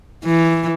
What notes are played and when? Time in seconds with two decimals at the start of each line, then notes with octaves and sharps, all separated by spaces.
0.24 E3